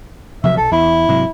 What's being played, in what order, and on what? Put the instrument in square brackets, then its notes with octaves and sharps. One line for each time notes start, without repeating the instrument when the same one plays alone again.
[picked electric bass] C3 F3 F#3 [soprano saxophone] E5
[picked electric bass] B1 [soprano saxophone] A4
[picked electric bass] E2 [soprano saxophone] E4
[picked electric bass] G#2 C3 F#3